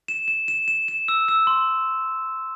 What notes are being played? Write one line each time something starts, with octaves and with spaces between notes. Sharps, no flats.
E7
E7
E7
E7
E7
E6
E6
C6